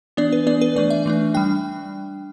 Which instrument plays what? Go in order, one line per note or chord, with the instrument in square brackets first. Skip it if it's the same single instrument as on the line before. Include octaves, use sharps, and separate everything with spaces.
[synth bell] E3 B3 D4 D5
B4
E3 B3 D4 D5
B4
E3 A3 D4 D5
E5
E3 A3 D4
G3 D4 G5